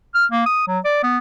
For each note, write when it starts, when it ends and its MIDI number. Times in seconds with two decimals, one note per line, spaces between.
0.15 0.26 89
0.32 0.43 58
0.46 0.67 87
0.67 0.79 54
0.85 0.99 74
1.03 1.18 59